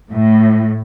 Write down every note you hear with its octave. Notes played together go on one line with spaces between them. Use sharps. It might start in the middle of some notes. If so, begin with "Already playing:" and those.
A2